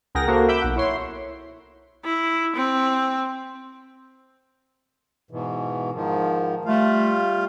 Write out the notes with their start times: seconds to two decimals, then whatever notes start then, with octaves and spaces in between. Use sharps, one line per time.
0.15 C#2 G#4 A#4 F#5 G5 A#6
0.27 A#3 F#4 A4 A#4 C5
0.48 E5 B5 D6 E6 G6
0.61 B1 F#5
0.76 E4 C#5 C6
2.05 E4
2.56 C4
5.31 G#2 B2 E3
5.93 G#2 D#3 F3
6.65 G3 A3 F4 F5